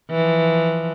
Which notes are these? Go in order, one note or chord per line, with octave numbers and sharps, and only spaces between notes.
E3 F3